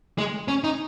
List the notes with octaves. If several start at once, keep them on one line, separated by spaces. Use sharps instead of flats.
G#3
C#4
D#4